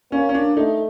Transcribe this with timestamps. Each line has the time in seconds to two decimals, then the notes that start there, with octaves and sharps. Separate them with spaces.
0.12 A#3 C#4
0.29 C#4
0.34 D4
0.56 A3 D#4